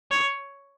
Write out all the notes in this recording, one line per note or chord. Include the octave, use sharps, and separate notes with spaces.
C#5